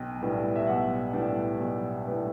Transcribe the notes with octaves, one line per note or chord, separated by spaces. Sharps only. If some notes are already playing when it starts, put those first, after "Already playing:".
Already playing: B1 G5
A2 G3 B3 D4
E5
B1 F#5
A2 G3 B3 D4
B1
A2 G3 B3 D4